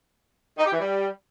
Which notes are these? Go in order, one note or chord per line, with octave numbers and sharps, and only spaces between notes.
D#4
G4
E3
G3